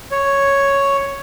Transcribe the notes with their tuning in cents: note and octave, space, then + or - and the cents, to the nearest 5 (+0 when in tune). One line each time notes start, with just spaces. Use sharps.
C#5 +0